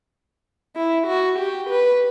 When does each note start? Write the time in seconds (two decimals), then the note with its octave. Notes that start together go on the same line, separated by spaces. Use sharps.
0.76 E4
1.07 F#4
1.39 G4
1.69 B4